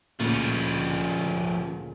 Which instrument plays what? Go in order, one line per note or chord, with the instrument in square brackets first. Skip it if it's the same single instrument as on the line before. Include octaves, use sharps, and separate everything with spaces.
[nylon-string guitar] D2 A#2 C#3 [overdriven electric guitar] F3 C#4